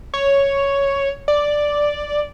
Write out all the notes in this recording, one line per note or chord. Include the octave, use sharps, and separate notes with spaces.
C#5
D5